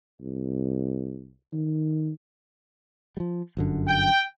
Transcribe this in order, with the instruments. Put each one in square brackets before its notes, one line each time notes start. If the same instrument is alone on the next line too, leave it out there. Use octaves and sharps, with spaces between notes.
[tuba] C2
D#3
[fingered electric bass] F3 G3
G1 F#2 D3
[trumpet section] G5